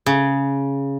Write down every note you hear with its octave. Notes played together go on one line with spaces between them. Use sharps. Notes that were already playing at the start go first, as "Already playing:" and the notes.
C#3